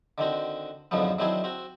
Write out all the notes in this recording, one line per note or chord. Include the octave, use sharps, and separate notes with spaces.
D3 D#3 C4 F#4
F2 G#2 D3 F3 F#3 B3
D#3 F#3 C4 D4 E4 G#4
C4 F#4